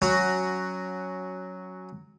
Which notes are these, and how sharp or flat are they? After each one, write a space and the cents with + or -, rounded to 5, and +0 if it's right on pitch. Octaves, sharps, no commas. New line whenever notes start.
F#3 +0 C#4 +0 F#4 +10